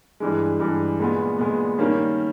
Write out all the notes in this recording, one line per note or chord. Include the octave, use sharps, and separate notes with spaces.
G2 E3 G#3
G2 E3 G#3
A#2 G#3 B3
A#2 G#3 B3
D#3 G3 A#3 C#4